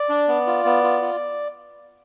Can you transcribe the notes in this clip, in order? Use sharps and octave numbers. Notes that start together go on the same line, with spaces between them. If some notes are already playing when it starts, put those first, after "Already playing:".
Already playing: D5
D4
B3
F4
B3
F4
F4